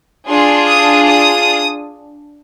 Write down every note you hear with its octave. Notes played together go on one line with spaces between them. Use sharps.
D4 F4 G#4 C6
D#6
D#6